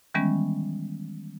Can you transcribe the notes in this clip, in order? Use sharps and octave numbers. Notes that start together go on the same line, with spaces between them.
D#3 E3 G3 G#3 B3 C#4